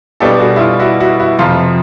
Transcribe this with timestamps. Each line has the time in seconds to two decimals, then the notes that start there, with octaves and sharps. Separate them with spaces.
0.20 B2 G3 B3 D4 G4 A4
0.40 F#4 G#4
0.56 E4
0.60 F4
0.80 E4 F#4
1.00 E4 F#4
1.20 E4 F#4
1.39 F2 C3 F3 F4